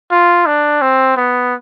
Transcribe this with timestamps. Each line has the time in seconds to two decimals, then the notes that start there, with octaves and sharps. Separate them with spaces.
0.11 F4
0.46 D4
0.81 C4
1.17 B3